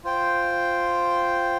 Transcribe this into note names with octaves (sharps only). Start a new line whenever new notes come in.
F4 C5 G5